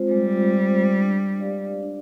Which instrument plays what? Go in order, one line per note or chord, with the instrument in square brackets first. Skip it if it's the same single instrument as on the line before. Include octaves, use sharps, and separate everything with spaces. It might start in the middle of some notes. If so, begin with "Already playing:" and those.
Already playing: [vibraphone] G#3 C4 F4 C5
[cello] G3 [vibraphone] G#3
[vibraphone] C4 F4 C5
D4
G4 D5 F5
D4